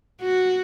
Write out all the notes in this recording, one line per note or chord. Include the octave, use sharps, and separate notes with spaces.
F#4